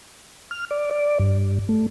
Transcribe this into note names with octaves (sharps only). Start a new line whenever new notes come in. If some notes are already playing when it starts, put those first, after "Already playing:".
F6
D5
D5
G2
A3